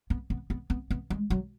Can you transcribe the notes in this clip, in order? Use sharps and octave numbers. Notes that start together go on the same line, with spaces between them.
B3
B3
B3
B3
B3
G#3
F#3